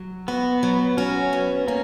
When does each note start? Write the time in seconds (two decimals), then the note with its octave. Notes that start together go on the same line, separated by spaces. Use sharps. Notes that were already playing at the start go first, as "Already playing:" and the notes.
Already playing: F#3
0.28 B3 F#4
0.63 F#3
0.97 C#4 F#4
1.33 B3
1.68 A#3 C#4